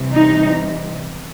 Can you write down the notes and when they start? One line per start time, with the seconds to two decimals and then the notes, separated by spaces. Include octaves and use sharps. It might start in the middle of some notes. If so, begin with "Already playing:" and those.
Already playing: C3 E3 G3
0.14 D#4